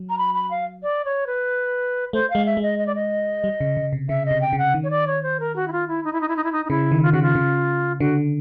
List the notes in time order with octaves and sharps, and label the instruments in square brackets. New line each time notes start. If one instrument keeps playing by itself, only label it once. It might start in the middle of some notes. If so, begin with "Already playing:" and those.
Already playing: [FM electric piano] F#3
[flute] A#5
B5
B5
F5
D5
C#5
B4
[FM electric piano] A3 [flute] C5
[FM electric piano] G#3 [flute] F5
[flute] E5
[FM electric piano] G#3
[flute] D#5
D#5
D5
D#5
[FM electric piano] G3
C#3
C#3
C3
[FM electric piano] C#3 [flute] E5
[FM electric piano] C3 [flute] D#5
[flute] G5
[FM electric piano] C#3
[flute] F#5
[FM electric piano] D#3
[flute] C#5
D5
C#5
C5
A#4
F#4
E4
F4
E4
D#4
E4
D#4
E4
D#4
E4
D#4
D#4
[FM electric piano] C#3 [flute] E4
[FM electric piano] D#3
[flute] F4
[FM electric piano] C#3 [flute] F#4
[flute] F4
[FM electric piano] C#3
[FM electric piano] D3 [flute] F#4